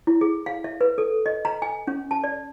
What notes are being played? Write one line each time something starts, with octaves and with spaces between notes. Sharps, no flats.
E4
G#4
F5
E5
B4
A4
D#5
A#5
G#5
C#4
A5
D5